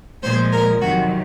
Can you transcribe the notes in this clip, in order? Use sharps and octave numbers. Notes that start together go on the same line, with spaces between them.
A#2 F3 G#3 C5
A#4
F2 C3 D#3 F#3 F#4